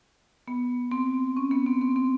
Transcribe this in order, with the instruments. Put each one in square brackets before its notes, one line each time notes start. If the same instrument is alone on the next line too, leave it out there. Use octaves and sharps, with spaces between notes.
[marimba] B3
C4
C#4
B3
C4
C4
C4